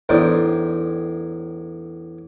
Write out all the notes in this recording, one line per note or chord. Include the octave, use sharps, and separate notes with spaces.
E2 A2 D4 D#4 C5 D5